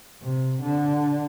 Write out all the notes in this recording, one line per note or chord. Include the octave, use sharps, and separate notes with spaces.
C3
D3